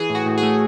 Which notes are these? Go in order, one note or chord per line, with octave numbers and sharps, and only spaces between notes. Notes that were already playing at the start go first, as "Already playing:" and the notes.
Already playing: E3 G#4
A2
F#4
A2
G#4
A3